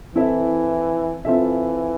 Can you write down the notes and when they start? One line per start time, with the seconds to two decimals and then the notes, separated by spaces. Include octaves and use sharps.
0.15 E3 C4 E4 A4 E5
1.25 E3 C4 F4 A4 E5